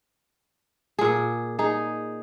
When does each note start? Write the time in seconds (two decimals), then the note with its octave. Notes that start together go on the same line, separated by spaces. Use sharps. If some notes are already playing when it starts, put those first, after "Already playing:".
0.99 A#2 G#4
1.59 D#4 G#4